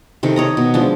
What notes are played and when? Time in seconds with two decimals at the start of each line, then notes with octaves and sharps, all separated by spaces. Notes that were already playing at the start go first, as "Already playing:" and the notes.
0.23 C3 D#3 A4
0.36 C#5 D#5 A#5
0.57 B2
0.74 F3 G#3 D4